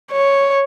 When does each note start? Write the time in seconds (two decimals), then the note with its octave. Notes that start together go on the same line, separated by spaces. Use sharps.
0.12 C#5